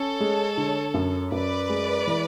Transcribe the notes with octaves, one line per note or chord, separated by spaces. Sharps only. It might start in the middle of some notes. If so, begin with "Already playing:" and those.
Already playing: C#4 A4 C#5
G#3
D3
F#2
F#2 B4 D5
G#3
E3